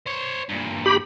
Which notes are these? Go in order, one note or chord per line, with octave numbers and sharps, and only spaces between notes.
C5 C#5
G2 A#2
G4 B5